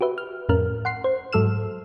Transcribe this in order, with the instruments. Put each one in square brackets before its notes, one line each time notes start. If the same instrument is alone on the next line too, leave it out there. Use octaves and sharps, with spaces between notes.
[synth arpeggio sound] F#4 G4 B4 E5
F6
F2 A2 C#4 A#4 F6
F#5 C6 C7
C5
G#2 F#3 A4 E6 F6 E7